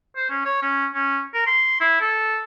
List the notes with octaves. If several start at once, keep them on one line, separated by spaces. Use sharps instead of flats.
C5
C#4
C#5
C#4
C#4
A#4
C6
E4
A4